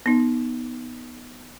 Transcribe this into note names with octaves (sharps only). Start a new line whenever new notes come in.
B3 D#4